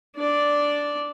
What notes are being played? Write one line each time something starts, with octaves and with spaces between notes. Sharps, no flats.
D4 D5